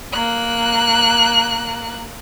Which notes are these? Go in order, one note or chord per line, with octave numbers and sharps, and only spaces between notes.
A#3 F#6